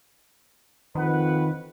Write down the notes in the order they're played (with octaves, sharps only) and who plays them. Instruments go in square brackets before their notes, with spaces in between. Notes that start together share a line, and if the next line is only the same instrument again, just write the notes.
[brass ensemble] F2 B4 F#5 [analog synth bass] D#3